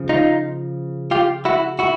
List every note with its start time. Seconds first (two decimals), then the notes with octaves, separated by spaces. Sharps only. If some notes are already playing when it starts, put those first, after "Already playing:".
Already playing: C#3 F3
0.09 D#4 F4
1.11 F4 G4
1.45 E4 F#4
1.79 E4 F#4